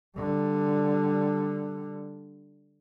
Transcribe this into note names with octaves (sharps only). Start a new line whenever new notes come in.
D3 G3